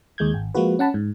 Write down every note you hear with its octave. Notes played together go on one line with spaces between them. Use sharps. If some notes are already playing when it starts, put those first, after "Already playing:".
D#2 G#3 G6 G#6
G#1
F3 G#3 A#3 F4 F#4 B4
C#4 F#5 A5 B5
G#2